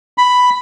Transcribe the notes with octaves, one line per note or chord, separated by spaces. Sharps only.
B5